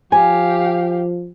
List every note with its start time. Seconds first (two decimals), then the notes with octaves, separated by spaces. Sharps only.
0.12 F3 G4 F5 G#5